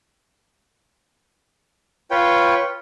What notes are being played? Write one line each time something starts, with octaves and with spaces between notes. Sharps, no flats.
F4 B4 C#5 G5